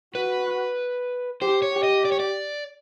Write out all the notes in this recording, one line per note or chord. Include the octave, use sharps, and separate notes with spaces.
F#4 B4
G4 C5
C#5
G4
D#5
D5
C#5
D5